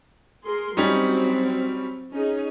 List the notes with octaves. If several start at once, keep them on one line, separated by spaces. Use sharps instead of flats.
G#4 A#4 C6
F#3 G3 C4 C#4 D#4
C#4 D#4 G#4